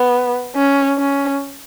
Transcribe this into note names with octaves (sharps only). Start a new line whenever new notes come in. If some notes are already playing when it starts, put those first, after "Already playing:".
Already playing: B3
C#4
C#4